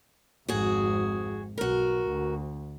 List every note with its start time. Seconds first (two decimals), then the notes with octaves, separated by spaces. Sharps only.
0.48 G#1 F2 F#4 G#4
1.58 B1 F#4 A#4
2.08 D2